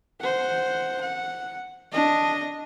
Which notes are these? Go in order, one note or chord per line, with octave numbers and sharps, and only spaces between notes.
C5 F#5
F#5
D4 D#5